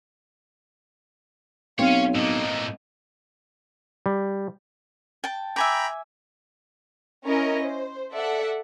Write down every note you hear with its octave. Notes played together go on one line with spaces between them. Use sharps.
B1 C4 C#4 C#5 F5
A2 A#3 D#5
G3
G5 A5
E5 G5 G#5 A#5 B5 D6
C#4 E4 A#4 D#5
C5
A4 D5 E5 F#5